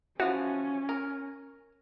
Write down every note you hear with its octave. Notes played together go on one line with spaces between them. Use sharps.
E3 F3 C#4 F#4
A#4